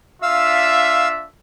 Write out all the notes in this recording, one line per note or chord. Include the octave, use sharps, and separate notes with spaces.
D4 F4 E5 F5 E6